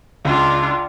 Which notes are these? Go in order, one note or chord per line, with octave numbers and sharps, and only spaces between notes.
C#2 D4 F4